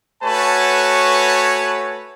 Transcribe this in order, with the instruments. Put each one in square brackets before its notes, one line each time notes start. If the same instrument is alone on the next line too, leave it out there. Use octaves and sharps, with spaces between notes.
[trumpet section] A3 F#4 B4 C#5 G#5 A5